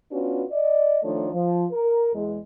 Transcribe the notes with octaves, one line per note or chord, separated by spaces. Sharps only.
B3 C#4 D4 F4 F#4 B4
D5 D#5
D#3 F3 A3 D4 C#5
F3
A#4
E2 G#3